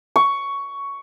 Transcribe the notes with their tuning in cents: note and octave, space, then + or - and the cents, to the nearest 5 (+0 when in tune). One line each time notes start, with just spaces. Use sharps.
C#6 +10